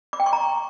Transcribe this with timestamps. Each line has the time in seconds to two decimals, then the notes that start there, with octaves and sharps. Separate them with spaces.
0.13 D6
0.20 G5
0.26 C#6
0.33 A#5